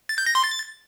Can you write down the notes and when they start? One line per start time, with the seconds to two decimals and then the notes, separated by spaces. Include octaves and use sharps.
0.09 A6
0.18 G6
0.26 A#6
0.35 C6
0.44 A6